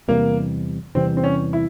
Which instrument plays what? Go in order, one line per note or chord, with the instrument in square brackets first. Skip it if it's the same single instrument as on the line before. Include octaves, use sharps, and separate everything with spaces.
[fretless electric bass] E2 C3 E3 G3 [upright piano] A#3
[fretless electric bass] E2 C3 E3 G3 [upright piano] C4
[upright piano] C4
C#4
E4